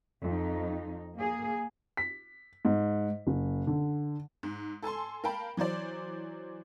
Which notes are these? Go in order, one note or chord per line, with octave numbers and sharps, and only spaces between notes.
F2 D#4
A#3 G#4
B6
G#2
F#1
D3
G#2
A4 G#5 A5 C6
A#4 F5 G5 A5 B5
E3 F#3 C5 D5